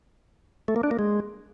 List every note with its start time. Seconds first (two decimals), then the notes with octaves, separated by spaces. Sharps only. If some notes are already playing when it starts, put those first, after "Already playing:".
0.68 A3
0.76 A#3
0.83 D4
0.91 A#3
0.99 G#3